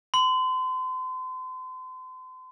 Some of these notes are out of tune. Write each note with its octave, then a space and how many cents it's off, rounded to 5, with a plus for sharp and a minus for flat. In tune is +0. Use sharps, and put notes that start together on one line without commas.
C6 -35